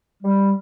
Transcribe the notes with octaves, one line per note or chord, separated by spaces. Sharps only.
G3